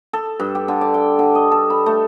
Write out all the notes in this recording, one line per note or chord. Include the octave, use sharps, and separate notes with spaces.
A4
G2
G4
D3
D5
G5
D3
D#5
A4
B5
A3